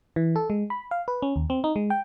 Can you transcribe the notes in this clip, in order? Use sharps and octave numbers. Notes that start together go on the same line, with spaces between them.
E3
A4
G#3
B5
F5
B4
C#4
D#2
C4
D#4
G#3
G5